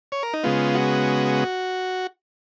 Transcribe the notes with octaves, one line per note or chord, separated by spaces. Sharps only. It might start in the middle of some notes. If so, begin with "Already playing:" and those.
C#5
A#4
D#4
C#3 G#3 B3 F4
F#4